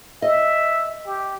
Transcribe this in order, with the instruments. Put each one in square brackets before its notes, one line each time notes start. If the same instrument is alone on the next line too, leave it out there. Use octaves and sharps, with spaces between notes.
[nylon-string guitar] D#5 [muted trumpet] E5
[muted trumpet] G4